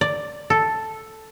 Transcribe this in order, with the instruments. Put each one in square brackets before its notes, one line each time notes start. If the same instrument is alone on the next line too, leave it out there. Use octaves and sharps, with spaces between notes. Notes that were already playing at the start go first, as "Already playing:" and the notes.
[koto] D5
A4